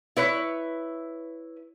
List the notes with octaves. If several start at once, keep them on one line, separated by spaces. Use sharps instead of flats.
E4 B4 C#5